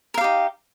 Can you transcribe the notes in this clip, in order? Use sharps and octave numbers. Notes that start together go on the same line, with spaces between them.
D#4 G4 A#4 F5